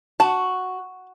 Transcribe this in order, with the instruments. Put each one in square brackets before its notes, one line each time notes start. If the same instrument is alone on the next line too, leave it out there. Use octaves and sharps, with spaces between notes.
[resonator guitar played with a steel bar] F#4 [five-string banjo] A5